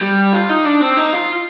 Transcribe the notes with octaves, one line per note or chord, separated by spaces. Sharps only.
G3
F4
D#4
D4
C4
D#4
F4